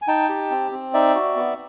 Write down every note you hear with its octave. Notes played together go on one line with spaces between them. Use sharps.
G#5
D#4 G5 A5
G4
C4
C4
D#4 D5 E5
F#4
B3